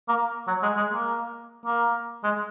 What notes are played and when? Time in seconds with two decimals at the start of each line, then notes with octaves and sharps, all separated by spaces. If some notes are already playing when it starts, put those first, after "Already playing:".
0.09 A#3
0.47 F#3
0.63 G#3
0.77 G#3
0.92 A#3
1.66 A#3
2.24 G#3